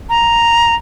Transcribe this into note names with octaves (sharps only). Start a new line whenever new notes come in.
A#5